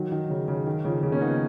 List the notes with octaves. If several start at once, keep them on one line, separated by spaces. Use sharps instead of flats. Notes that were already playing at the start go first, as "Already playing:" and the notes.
Already playing: D#3 F#3
D#3
C#3
C#3
D#3
C#3 F3
C#3 F3
A#3 C#4
B3 D#4